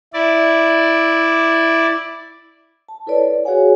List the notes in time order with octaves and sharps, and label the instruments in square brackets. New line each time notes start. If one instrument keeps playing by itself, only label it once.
[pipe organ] E4 D5
[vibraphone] A5
E4 A4 B4 C#5 D5
F#4 G#4 C#5 F5 F#5 G#5